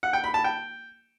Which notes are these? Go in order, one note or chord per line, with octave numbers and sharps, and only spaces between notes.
F#5
G5
B5
A5
G5